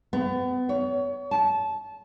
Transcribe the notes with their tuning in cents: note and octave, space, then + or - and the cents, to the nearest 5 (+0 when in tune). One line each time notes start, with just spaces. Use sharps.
B3 +30
C#5 +30
A5 -20